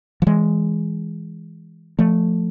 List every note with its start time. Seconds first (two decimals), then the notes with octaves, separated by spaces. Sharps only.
0.22 F3
0.27 E3 G#3
1.99 F3 A3